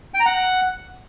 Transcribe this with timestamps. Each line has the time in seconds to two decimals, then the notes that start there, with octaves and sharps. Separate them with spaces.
0.14 G5
0.20 A#5
0.26 F#5